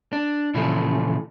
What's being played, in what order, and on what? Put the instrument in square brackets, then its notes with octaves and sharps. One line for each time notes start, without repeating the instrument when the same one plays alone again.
[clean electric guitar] D4
A#2 C#3 E3 F3 A3